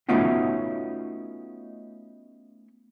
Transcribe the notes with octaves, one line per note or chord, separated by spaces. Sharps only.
A3 B3 C#4 D#4 F4 F#4